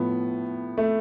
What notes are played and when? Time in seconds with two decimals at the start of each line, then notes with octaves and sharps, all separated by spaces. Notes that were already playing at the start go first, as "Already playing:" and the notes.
Already playing: A2 F3 B3
0.78 A3